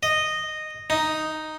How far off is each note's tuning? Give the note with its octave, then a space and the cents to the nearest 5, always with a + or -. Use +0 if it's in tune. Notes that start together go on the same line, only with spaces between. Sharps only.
D#5 -10
D#4 +0